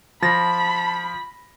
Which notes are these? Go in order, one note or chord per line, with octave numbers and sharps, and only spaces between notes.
F3 A5 B5 A6 A#6